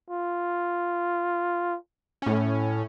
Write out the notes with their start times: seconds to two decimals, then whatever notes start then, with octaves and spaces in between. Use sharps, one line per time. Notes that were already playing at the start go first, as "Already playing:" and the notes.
0.10 F4
2.22 A2 C#4